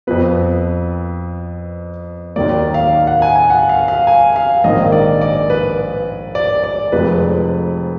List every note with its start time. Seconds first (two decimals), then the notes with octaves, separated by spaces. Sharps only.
0.07 F2 F3 B3 B4
2.36 D#2 D#3 F#3 A#3 D5
2.74 F5
2.93 F5
3.07 F#5
3.22 G#5
3.36 G#5
3.50 F#5
3.69 F5
3.88 F5
4.07 G#5
4.36 F5
4.64 A#1 G#2 D#3 A#3 D#5
4.92 D5
5.21 D5
5.50 B4
6.35 D5
6.64 D5
6.92 F1 F2 F3 G#3 B4